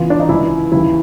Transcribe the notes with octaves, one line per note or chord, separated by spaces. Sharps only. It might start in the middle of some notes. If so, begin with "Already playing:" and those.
Already playing: E2 C#3 E3 F4
D4
D#4
C#2 C#3 E3 E4
D#2 C#3 E3 E4